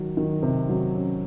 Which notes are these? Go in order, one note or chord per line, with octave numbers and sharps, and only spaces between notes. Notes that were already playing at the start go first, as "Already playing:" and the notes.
Already playing: D#3 F#3
D#3
C3
F#3
C#4